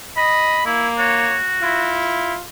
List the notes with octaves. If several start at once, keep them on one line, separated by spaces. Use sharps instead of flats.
D#5 B5
A#3 E4
F#4 C#5
E4 F4